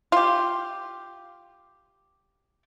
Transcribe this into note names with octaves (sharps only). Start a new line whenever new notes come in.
F4 G4